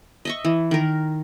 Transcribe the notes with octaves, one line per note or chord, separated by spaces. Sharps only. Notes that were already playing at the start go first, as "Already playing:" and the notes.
D#5 E5 C#6
E3
D#3 A#4